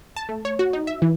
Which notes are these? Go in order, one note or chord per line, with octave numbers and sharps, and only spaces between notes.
A5
A3
C#5
F#4
D#4
E5
E3